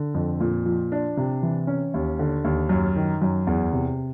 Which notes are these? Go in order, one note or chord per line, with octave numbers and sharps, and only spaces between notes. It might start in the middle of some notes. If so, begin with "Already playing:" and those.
Already playing: D3
F2
A#2
F3
D4
C3
E3
C#4
D#2
D3
D#2
F#2
D#3
F#2
E2
C3